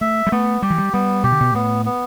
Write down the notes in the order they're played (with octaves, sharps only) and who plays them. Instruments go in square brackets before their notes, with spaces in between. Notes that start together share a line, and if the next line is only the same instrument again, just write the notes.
[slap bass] A3 [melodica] E5
[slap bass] G3
[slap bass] A3 [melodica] B3
[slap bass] G3 [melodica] G4
[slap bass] E3
G3
[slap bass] G3 [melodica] B3
[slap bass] B2 [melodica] G4
[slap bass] D3
B2
[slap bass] A2 [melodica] B3
[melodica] B3